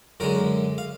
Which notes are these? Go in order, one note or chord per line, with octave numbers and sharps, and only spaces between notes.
F#2 D3 G#3 F#4 A#4
F5